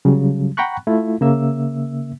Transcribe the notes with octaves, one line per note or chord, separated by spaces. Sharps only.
C#3 F#3 G3
F#5 G5 A#5 B5 C#6 F#6
A3 E4 F4
C#3 A#3 E5 E6